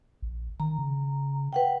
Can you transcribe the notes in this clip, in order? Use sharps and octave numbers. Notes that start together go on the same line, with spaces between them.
A#1
D#3 A#5
C#3
B4 F#5 G5